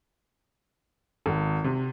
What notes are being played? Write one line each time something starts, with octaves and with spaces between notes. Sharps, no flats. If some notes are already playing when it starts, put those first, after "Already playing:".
G#1
C3